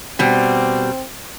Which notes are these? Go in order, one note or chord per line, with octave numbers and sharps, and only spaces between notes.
B2 G3 C4